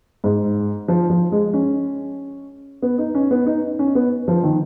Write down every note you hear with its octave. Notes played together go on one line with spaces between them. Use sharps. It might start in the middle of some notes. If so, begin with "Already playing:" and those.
G#2
F3
F3
G#3
C#4
B3
D#4
C#4
B3
D#4
C#4
B3
F3
D#3